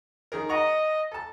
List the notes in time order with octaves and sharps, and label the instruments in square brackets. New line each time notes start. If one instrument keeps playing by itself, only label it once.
[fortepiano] D#3 G#4 A#4
[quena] D#5 [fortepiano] F#5 A#5 C#6
[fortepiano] A4 A5